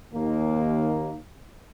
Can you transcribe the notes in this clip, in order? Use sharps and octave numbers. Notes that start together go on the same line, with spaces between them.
D#2 A#3